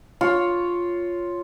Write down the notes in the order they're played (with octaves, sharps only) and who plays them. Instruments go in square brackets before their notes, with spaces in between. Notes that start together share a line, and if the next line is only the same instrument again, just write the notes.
[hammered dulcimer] F4 C#5